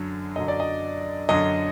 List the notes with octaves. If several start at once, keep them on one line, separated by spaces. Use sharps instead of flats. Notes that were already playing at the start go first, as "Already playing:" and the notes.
Already playing: F#2 D3 F#3
F#2 D3 F#3 D#5
D5
D#5
F#2 D3 F#3 D#5